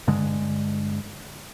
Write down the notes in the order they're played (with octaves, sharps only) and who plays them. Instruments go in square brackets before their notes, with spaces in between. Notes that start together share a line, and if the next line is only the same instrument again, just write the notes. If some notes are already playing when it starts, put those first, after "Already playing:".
[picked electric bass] G2 D3 G#3